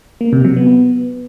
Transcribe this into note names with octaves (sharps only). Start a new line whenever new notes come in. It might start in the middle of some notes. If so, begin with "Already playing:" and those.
A#3
C3
F#3
B3